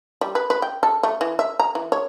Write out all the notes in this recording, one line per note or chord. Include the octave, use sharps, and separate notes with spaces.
G3
B4
B4
G5
A4
A3
E3
E5
A#5
E3
C#5